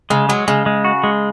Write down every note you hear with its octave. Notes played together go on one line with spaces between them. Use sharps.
C#3 G#3
F#3 G#3
C#3 G#3
G#3
F#4
G#3